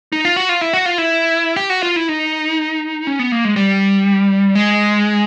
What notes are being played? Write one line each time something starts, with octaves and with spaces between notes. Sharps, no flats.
D#4
F4
F#4
F4
E4
F#4
F4
E4
G4
F#4
F4
E4
D#4
C#4
B3
A#3
G#3
G3
G#3